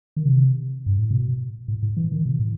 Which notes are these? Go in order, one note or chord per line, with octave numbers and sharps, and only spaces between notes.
D#3
C3
G2
A2
B2
A2
A2
E3
D#3
B2
A2